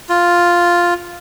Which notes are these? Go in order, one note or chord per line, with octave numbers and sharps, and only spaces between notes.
F4